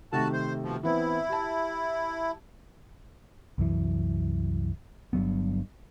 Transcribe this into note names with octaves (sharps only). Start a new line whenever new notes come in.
C3 D#3 A3 F#4 A5
C5
B2 F3
E3 B3 C4 E4
G4 A5
C2 F#2 E3
G1 G2 F#3 B3